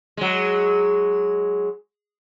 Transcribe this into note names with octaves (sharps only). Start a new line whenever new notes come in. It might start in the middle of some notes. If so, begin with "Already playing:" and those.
F#3 G#3